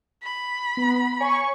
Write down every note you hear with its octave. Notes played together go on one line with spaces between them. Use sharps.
B5
B3
C#5 G#5 C#6